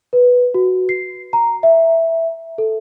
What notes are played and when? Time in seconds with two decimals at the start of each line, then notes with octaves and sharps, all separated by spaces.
0.13 B4
0.54 F#4
0.89 C7
1.33 A#5
1.63 E5
2.58 A4